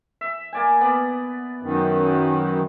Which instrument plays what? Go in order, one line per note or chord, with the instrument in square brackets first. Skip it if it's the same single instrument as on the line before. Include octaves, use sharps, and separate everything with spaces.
[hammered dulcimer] E5
A#3 D5 G#5
B3 D5
[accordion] F#2 D#3